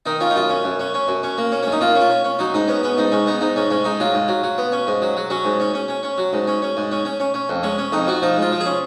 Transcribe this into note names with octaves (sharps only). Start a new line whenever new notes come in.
D#3 D#4
C#4 F4
D#4
F#2 F4
C#4
F#2
C#4
C#4
F#2
C#4
A#3
C#4
C#4
F#2 D#4
A#3 F4
C#4
F4
C#4
C#4
F#3 D#4
G#2 D#4
B3 C#4
B3 C#4
G#2 D#4
G#2 C#4
B3 D#4
G#2 D#4
G#2 C#4
G#2 C#4
G#2 D#4
F#3 F4
G#2
F#3
F#3
B3
C#4
G#2
F#3
F#3
F#3 C#4
G#2
C#4
C#4
C#4
C#4
F#3
G#2
C#4
C#4
G#2
C#4
C#4
C#4
C#4
F2
G#3 C#4
C#4
F2 D#4
F3 F#4
F3 D#4
G#3
F4
F3
G#4
C#4